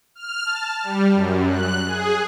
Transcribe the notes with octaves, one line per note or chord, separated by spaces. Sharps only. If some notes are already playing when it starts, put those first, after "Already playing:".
F6
A5
G3
F#2
F#6
G#4